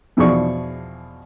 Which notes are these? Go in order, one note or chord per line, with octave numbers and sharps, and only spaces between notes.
E2 B2 F3 G#4 D5 C#6